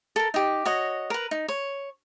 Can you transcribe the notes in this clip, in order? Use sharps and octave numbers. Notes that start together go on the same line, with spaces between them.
A4 A#4
D#4 G4
F#4 C#5 D#5
A#4 B4
D#4
C#5